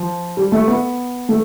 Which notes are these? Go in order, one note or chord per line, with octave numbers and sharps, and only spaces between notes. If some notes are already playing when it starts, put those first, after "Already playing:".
Already playing: F3
G3
A3
B3
A3